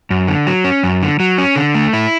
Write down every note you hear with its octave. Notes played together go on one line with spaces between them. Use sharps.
F#2
D3
F#3
C#4
F#2
D3
F#3
C#4
D3
A3
E4